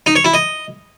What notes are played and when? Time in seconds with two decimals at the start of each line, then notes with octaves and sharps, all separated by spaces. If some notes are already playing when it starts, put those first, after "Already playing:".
0.06 D#4
0.15 C#5
0.25 E4
0.34 D#5